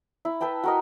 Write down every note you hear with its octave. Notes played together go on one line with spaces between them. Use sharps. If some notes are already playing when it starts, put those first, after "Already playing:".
E4
B4 E5 G5 A5
F#4 A#4 D#5